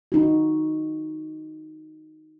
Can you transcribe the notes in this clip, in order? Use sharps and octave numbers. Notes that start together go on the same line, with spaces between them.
D#4 F#4